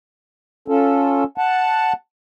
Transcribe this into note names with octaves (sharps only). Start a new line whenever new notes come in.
C#4 F4 A4
F#5 A5